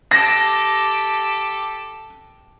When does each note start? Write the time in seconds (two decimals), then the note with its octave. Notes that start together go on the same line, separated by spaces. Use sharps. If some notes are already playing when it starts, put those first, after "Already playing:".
0.11 G4 A4 A#6